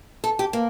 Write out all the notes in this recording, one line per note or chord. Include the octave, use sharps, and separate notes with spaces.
A4
G4
A#3